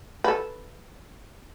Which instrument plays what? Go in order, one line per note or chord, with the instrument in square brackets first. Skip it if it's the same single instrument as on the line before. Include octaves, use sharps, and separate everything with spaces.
[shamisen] A4 B4